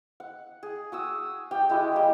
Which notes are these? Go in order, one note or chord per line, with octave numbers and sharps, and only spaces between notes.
F#5
G#4
F#4 D#6 E6
G4 G5
G#3 E4 F#4 D#5
G3 A#3 G4